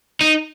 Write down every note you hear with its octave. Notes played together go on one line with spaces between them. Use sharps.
D#4